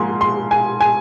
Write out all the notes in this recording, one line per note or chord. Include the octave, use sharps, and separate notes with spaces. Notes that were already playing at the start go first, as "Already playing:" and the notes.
Already playing: G#2 F3 A#3 G#5 C6
C6
G#5
G#5